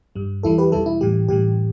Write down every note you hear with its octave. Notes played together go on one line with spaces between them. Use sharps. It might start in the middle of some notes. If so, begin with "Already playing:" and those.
G2 G3
E2 E3 G3 E4 A4
G4 B4
E2 B2 G3 E4 A4
E4
A2 E3 G3 G4
A2 E3 G3 G4